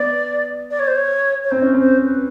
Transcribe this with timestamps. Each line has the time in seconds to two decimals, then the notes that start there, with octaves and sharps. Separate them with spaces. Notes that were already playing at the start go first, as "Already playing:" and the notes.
Already playing: B3 D5
0.71 D5
0.79 C#5
0.87 C5
0.95 C#5
1.44 C#5
1.51 C4 C5
1.62 C#4
1.74 C4 C5
2.04 B4